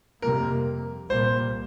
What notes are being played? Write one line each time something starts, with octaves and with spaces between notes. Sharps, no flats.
F2 C3 G3 A#3 A#4
C2 A#2 G3 A#3 C5